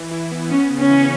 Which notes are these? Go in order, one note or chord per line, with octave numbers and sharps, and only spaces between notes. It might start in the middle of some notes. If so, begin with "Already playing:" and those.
Already playing: E3
E4
B3
B3 C#4
C#3
C#4
E3